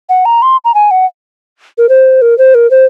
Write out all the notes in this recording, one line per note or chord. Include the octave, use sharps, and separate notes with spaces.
F#5
A#5
C6
A#5
G#5
F#5
A#4
C5
A#4
C5
A#4
C5